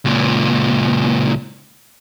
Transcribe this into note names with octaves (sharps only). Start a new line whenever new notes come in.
C#2 A#2